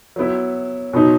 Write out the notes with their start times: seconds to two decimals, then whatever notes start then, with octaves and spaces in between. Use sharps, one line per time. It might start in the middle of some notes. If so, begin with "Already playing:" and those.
0.16 F#3 B3 E4
0.93 B2 F#3 B3 D#4